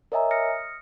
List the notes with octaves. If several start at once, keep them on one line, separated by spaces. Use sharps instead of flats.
A#4 C#5 D#5 E5 G#5 A#5
D#6 F6 A#6 C#7